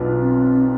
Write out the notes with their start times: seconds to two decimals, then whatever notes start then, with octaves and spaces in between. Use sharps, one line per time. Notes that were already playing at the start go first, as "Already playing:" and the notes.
Already playing: B1 B2 B3 D4 F4
0.20 C4